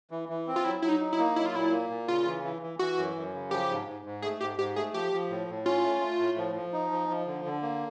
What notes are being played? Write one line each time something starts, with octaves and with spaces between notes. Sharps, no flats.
E3
E3
C4
F4
F#3 E4
F#3 E4
D#4
D#4
E4
A#3
F#3 E4
F4
A#2 E4
A#3
A#2
C#3 F4
E3
E3
E3
E3 F#4
F#2
F#2
C#3
F3 G4
G#2
G#2
G#2
A3 G#4
G#2 G4
G#2 G4
A3 G#4
F3 G4
F3
A2
A2
C#4 F4
A3
A3
A2
F3
F3
D#4
F3
F3
D3
D3
A#3